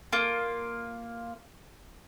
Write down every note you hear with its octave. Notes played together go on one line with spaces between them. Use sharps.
A#3 F4